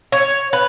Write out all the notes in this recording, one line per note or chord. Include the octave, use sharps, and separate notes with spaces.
C#5
B4